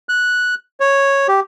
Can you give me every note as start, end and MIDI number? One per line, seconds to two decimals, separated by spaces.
0.09 0.55 90
0.80 1.27 73
1.28 1.40 67